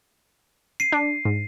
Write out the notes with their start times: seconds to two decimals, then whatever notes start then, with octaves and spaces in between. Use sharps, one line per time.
0.80 C7 D#7
0.92 D4
1.25 G#2